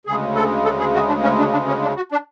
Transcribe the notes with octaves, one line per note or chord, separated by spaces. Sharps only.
D2 C#3 G#3 G#4
A4
A4
G#4
F#4
D4
C#4
D4
D4
C#4
D4
F#4
D4